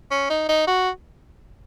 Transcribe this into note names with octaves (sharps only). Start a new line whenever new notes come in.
C#4
D#4
D#4
F#4